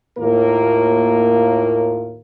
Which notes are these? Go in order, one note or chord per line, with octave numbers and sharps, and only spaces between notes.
D#2 A2 A#3 F4 A#4